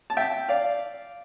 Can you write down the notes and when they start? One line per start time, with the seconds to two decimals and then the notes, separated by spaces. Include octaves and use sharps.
0.10 A5
0.17 E5 G5
0.49 D5 F5